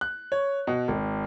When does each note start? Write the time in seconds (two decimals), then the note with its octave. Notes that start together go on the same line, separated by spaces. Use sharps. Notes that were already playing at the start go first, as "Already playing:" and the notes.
0.01 F#6
0.32 C#5
0.67 B2
0.88 G#1